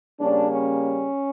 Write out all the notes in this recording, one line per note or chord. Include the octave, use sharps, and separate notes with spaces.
C#3 G3 A#3 C#4 D4
C#4